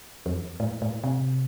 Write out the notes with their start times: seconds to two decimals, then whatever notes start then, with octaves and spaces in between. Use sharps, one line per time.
0.26 F2
0.60 A2
0.82 A2
1.04 C3